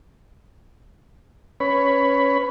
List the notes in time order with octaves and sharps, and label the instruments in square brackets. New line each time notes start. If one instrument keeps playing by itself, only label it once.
[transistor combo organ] C#4 B4 C#5 B5